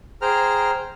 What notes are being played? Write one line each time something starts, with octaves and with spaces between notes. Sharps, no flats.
G#4 C5 G5 A#5 F6